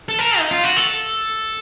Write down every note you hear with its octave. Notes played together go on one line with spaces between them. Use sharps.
A4
A#4
D#4
F4
F#4
A4